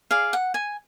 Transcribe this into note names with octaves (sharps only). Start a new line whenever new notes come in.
G#4 D5 F5
F#5
G#5